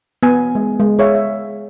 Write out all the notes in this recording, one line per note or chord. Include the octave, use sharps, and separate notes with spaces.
B3 G#5
G#3
G#3
G#4 C#5 E5 F5
E5